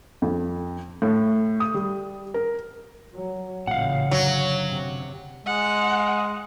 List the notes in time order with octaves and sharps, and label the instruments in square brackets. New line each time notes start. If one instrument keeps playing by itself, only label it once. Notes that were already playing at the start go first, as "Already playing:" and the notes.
[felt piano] F2
A2
D#6
G3
A#4
[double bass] F#3
[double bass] A1 C#3 [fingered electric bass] A#2 [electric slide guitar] F5 F#5
[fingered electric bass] F#2 D3 [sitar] F#3
[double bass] C3
[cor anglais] G#3 [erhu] F#5